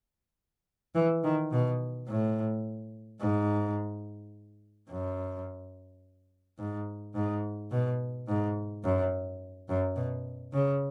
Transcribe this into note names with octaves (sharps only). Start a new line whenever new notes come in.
E3
D#3
B2
A2
G#2
F#2
G#2
G#2
B2
G#2
F#2
F#2
B2
C#3